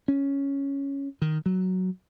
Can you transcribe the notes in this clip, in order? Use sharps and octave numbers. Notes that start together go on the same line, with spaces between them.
C#4
D#3
F#3